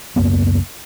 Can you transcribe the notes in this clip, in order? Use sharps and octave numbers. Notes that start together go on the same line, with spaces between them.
C#2 F#2 A#3 B3